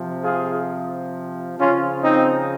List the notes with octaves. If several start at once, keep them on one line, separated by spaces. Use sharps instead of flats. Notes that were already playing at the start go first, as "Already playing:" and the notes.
Already playing: C3 F3
F4 G#4
C#3 F3 C#4 F4
C4 D#4